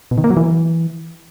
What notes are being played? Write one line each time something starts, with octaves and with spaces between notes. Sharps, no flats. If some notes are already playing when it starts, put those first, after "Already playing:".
B2
D#3
A#3
F#3
E3